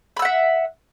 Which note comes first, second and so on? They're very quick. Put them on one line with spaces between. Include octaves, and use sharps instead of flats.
B5 E6 F#5 E5